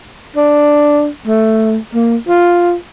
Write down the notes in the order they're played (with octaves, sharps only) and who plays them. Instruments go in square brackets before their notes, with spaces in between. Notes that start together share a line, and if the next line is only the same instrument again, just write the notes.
[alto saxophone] D4
A3
A#3
F4